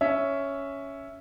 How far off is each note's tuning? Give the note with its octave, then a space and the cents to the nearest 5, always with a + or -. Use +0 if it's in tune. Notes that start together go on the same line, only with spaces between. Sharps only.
C#4 +5 E5 +0